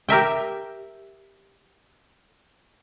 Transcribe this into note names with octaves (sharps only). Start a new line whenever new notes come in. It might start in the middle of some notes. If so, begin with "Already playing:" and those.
G4 A#4 E5 G5